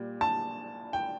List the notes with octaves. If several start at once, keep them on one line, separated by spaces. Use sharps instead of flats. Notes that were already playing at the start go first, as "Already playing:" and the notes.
Already playing: A#2 G3
A5
G5